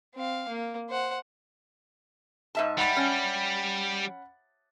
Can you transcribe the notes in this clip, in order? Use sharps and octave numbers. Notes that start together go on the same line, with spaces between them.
C4 F5
A#3
C5 F#5
G#2 E5 A5
G3 F#5 B5 A6
C#4